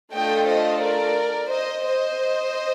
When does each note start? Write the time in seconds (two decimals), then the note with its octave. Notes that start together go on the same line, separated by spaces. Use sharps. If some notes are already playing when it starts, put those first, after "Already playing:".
0.14 A3 D4 F4 A4 D#5 G5
0.48 C5 D#5
0.83 A#4 D5
1.51 C5 D#5
1.85 C5 D#5